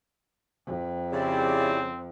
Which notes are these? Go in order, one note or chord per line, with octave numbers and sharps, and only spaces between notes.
F2
C#3 C4 E4 G4 D5